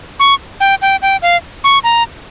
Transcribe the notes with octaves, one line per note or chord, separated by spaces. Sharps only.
C#6
G5
G5
G5
F5
C#6
A#5